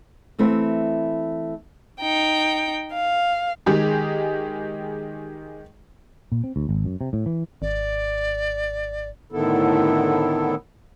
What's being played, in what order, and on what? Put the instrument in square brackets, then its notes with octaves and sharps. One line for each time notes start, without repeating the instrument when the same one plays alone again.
[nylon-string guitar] E3 A3 C4 E4 B4
[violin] D#4 G5
F5
[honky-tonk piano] D#3 G#3 G4 G#4
[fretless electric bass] A#2
C4
D2
G#1
F#2
C3
A2
E3
[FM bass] G#1 [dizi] D5
[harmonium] A2 D3 D#3 B3 E4 A4